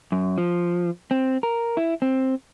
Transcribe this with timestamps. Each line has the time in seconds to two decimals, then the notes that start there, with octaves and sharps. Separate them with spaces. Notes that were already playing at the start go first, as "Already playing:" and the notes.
0.12 F#2
0.38 F3
1.11 C4
1.43 A#4
1.77 E4
2.02 C4